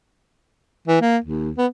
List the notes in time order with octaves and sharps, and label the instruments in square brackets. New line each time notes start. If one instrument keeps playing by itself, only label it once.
[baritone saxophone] E3
A#3
D#2
B3